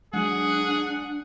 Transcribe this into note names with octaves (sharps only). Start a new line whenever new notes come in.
F#3 G#3 D4 G#4 F#5